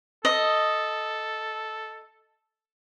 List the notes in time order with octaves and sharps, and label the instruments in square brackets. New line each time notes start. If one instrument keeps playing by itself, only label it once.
[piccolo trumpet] A4 [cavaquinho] D#5